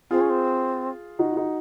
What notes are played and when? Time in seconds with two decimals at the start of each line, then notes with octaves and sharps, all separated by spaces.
0.11 C4 F4 G#4
0.21 C#4
0.30 C4
1.19 D#4 F#4
1.31 F4
1.37 D#4 F#4